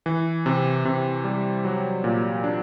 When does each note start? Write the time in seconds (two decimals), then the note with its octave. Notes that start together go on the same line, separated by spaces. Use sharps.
0.06 E3
0.46 C3
0.85 C3
1.24 G3
1.65 F#3
2.04 A#2
2.44 D4